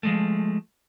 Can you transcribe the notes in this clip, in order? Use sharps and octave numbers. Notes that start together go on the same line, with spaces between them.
F3 G#3 A3